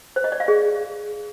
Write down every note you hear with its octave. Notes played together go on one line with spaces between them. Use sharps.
C5
D#5
D5
F5
G#4